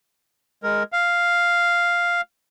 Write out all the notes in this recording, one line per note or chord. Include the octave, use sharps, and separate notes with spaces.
G#3 A#4
F5